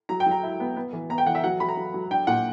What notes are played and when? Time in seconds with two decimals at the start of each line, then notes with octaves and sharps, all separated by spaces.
0.09 F#3 A#5
0.20 G5
0.26 F#3 A#5
0.43 E4
0.60 B3
0.76 B3
0.93 E3
1.10 B3 A#5
1.18 G5
1.26 E3 F#5
1.35 E5
1.44 F#3 F#5
1.60 F#3 B5
1.69 A#5
1.77 F#3
1.94 F#3
2.11 D4 G5
2.27 A#2 F#5